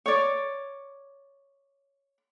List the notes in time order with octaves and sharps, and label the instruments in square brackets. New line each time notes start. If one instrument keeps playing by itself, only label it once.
[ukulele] C#5 D5